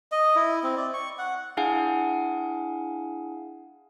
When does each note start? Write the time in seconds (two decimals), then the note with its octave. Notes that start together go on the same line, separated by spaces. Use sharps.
0.12 D#5
0.36 E4
0.63 C4
0.77 D5
0.94 C#6
1.18 F#5
1.57 D4 E4 G#4 F5 F#5 G#5